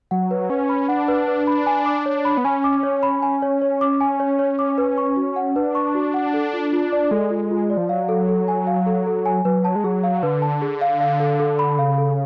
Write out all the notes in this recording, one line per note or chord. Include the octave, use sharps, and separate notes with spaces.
F#3 F#5
B4
C#4 B4
B5
D4 F#5
B4
B4
B5
G#5
D6
C#5
B5
B3
C#4 G#5
D6
C#5
B5
G#5
C#5
C#5
D6
G#5
C#5
C#5
D6
B4
C#6
F#4
F#5
D4 B4
C#6
F#4
F#5
A4
F4
F4
D5
G#3 A4
F4
F4
D5
F3
F#3 F5
A4
A4
G#5
F5
A4
A4
G#5
F#3 B4
A5
G#3
F#3 G#4
F5
D3 B4
A5
G#4
F5
F5
A4
A4
B5
C#3 F5
A4